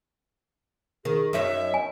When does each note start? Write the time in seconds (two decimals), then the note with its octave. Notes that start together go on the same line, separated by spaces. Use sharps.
1.05 D#3 G#4
1.33 F#2 D#4 C#5 E5
1.74 G#5